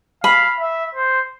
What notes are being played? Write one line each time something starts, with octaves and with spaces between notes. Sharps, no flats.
F5 B5
E5
C5